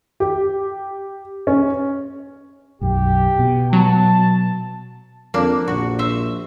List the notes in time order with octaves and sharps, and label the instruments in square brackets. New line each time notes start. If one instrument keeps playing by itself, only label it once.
[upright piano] G4
C#4
[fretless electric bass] B1 F#2 [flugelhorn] G4
[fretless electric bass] B2
[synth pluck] F#3 [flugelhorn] A5
[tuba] F2 [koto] A#3 D4
[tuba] A#1 [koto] F#4
[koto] C5 E5